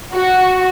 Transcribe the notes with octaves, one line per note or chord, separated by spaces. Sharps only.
F#4